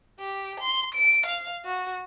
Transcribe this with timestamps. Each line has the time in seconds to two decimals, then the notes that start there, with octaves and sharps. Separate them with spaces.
0.20 G4
0.60 C6
0.95 D7
1.26 F5
1.65 F#4